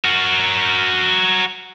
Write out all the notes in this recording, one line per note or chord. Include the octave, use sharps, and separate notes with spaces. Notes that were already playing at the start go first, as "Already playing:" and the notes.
F#4 A#4